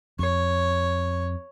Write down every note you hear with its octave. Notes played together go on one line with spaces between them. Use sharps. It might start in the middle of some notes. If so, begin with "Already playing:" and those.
F2 C#5